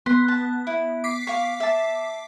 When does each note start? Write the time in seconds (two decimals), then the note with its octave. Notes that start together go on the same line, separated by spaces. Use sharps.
0.06 B3 C6
0.28 A5
0.67 E4
1.04 D6 B6 C7
1.27 F5 C#6
1.60 E5 A5